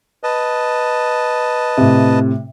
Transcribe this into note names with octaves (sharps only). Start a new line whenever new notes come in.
B4 D#5 A5
A2 C3